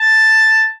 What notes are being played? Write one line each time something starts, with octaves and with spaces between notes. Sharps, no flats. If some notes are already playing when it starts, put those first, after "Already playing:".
Already playing: A5